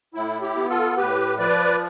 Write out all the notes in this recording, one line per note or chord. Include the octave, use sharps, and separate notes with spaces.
A2 E4
E4 G4
B3
F4 A4
A2 G4 B4
F3 B4 D5